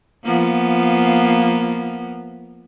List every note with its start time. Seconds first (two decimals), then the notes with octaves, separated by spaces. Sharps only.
0.24 F3 A#3 B3